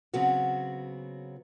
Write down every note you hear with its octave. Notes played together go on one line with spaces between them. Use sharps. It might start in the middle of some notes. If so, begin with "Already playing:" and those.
C#3 F#3 B3 C4 F#4